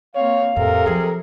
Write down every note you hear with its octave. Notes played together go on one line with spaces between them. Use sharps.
A#3 C4 C#5 F5
F2 A2 C3 A4 A#4
F3 F#3 G#4